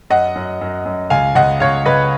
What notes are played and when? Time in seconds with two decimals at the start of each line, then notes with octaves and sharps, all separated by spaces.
0.10 F#2 D#5 F#5
0.35 F#2
0.61 F#2
0.86 F#2
1.10 C#2 F5 G#5
1.35 C#2 D#5 F#5
1.60 C#2 C#5 F5
1.86 C#2 B4 D#5